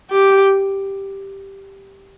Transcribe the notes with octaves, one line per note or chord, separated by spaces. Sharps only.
G4